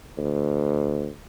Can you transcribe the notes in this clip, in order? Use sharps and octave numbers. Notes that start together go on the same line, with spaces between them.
D2